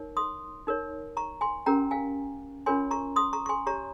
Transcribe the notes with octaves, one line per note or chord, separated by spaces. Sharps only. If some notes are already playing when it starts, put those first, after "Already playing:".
Already playing: D#4 A#4 C#5
C6 D#6
D#4 A#4 C#5
A#5 C#6
G#5 C6
C#4 G4 A#4 G5 A#5
F5 G#5
C#4 F4 A#4 C#5 G#5 C6
A#5 C#6
C6 D#6
A#5 C#6
C#6
G#5 C6
G4 C#5 A#5 C#6